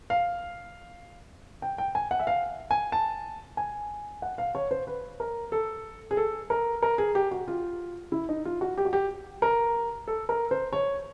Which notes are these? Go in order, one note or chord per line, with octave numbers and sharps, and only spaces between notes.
F5
G5
G5
G#5
F#5
E5
F5
G#5
A5
G#5
F#5
F5
C#5
C5
B4
A#4
A4
G#4
A4
A#4
A#4
G#4
G4
F#4
F4
E4
D#4
F4
F#4
G4
F#4
G4
A#4
A4
A#4
C5
C#5